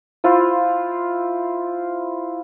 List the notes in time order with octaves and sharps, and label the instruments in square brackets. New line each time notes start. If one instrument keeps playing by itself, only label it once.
[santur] E4 F4 C5